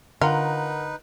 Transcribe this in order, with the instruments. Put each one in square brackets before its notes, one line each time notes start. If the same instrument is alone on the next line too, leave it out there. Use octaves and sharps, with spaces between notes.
[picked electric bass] D3 [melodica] D#4 B4 [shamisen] F4 [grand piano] A#4 F#5